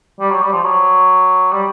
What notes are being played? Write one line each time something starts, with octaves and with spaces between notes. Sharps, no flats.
G3
F#3
G3
F3
F#3
G3